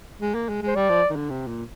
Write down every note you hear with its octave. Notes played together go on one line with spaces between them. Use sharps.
G#3
A#3
G#3
G#3
C5
G3 D5
F3
D#3
D3
C3
A#2